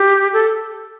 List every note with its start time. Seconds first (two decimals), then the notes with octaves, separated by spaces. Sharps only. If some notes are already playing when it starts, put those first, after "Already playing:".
Already playing: G4
0.33 A4